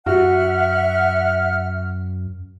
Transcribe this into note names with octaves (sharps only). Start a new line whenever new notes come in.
F#2 F#4 E5 F#5 F6 F#6